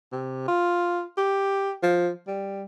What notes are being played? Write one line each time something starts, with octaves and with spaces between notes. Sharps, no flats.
C3
F4
G4
F3
G3